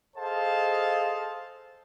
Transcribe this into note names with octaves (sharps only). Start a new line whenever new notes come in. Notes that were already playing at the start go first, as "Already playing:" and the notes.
G#4 A4 C5 D#5 F5 A5